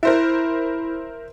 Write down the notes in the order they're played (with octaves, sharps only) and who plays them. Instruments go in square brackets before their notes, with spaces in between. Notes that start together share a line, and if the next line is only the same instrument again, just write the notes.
[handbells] E4 [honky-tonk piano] A#4 C5 E5